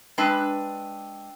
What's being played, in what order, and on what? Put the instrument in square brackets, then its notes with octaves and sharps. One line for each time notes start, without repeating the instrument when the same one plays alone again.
[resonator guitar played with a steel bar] G#3 D4 B4 [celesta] G5 E6 D#7